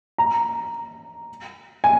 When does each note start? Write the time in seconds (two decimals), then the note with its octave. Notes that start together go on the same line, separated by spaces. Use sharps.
0.18 A#5
1.84 G#5